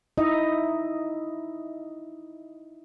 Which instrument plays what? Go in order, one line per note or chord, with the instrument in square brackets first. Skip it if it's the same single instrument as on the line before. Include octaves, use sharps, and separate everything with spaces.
[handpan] D#4 E4 D#5 E5